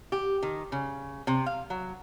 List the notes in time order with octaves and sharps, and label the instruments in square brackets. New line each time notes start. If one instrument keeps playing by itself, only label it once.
[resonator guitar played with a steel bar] G4
D#3
C#3
C3
F5
F#3